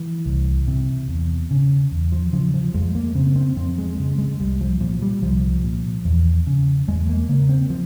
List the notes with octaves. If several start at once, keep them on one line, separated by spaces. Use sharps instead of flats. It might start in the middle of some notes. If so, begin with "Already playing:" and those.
Already playing: E3
C2
C3
E2
C#3
E2
F3
C#3 F3
F3
F2 G#3
A#3
C#3 C4
C4
F2 C4
G#3
C#3 G#3
G#3
C2 G3
F3
A#2 F3
G3
C2 F3
A#2
E2
C#3
E2 G#3
A#3
C#3 A#3
C4
F3